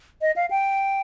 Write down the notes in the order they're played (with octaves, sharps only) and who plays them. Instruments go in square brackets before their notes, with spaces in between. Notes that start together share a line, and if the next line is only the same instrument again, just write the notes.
[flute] D#5
F5
G5